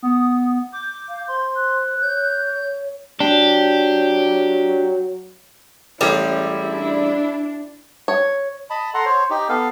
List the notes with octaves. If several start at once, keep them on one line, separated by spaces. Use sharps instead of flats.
B3 D#6
D6 G6
F5
C5 C6
F#6
C#5 G6
F#3 D4 G4
A1 G3 G#3 C#4 E4
D4
C#5
D#5 A5 B5
A4 F#5 A#5 C6
C5 C#5
D#4 G4
B3 A4 F5